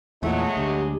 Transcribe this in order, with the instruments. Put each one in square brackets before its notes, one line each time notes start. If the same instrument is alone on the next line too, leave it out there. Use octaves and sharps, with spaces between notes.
[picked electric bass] E2 A#2 [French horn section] F#3 G#3 D#4 [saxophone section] A3
[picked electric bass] D2 [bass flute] G4